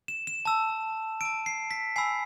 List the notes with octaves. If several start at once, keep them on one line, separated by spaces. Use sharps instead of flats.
E7
E7
A5 E6
A5 E6 D7
C7
B6
G#5 B5 E6 C7